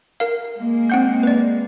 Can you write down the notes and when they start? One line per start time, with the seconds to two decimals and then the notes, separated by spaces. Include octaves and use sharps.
0.20 A#4 F5
0.57 G#3 A#3
0.90 C4 F#5 G6
1.23 B4 D5